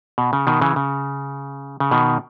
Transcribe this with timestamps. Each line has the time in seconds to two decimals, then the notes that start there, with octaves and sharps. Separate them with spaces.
0.18 B2
0.33 C#3
0.47 B2 D#3
0.61 C#3 E3
0.76 C#3
1.80 C#3
1.91 B2 D#3